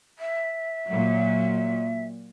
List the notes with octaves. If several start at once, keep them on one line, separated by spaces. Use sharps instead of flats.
E5
A#2 F#3